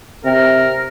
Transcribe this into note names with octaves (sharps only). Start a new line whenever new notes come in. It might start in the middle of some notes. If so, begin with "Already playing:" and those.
C3 A#4